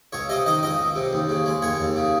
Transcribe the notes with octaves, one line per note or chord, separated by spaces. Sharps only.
C#2 C#5
C3 D#5
D#3 D#5
C#2 D#5
C#2
C3
D#2
C#3
G#3
D#2 C#5
D#2
C#3